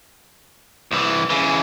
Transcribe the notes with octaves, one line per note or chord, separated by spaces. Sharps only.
C2 E3
C#3 E3